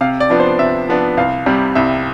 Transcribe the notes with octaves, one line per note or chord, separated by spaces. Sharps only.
C3 F5
D5
F3 B3 D4
C5
C3 E5
F3 B3 D4
C2 F5
C3 G3
C2 E5